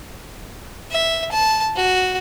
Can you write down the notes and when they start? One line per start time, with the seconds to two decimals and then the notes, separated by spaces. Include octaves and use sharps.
0.91 E5
1.32 A5
1.76 F#4